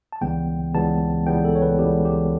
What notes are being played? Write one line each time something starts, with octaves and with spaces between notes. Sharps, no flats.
A5
C#2 C#3 E3 G3 B3 G5
C#2 C#3 E3 G3 B3 A5
C#2 C#3 E3 G3 B3 G5
A4
C#5
B4
C#2 C#3 E3 G3 B3 G4
G4